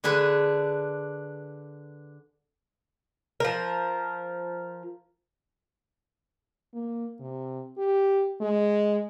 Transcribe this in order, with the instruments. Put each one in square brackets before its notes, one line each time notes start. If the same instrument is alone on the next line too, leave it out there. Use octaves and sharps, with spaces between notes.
[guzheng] D3 D4 G#4 B4
[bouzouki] F3 A#4
[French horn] A#3
C3
G4
G#3